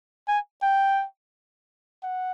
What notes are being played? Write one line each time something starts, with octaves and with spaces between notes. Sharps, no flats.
G#5
G5
F#5